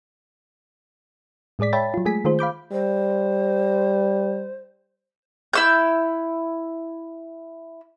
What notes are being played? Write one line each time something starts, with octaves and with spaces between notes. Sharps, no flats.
A2 G#3 G#4 D5 B6
C#5 E5 G5 A5 B5 A6
F#3 F4
G#3 A3 G#4 G#5 B6
D#3 A3 F4 G#4 C5
F5 B5 D6 G6
G3 C5
E4 E6 G6